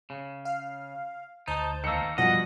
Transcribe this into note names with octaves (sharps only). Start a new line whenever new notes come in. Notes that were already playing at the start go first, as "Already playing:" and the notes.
C#3
F5
D2 D#4 C5 A5 G6
D#3 A#3 E6 C#7
F#2 B2 F3 G3 D#5 F#5